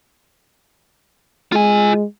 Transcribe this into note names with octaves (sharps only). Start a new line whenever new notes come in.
G#3 F4 G#5